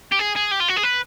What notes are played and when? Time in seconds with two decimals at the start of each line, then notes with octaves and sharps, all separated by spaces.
0.12 G4
0.19 G#4
0.36 G#4
0.51 G4
0.60 F4
0.68 F#4
0.76 G#4
0.83 B4